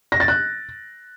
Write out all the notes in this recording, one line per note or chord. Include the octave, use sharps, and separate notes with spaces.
A#6
A6
F#6